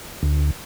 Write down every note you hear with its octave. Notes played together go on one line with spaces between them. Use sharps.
D2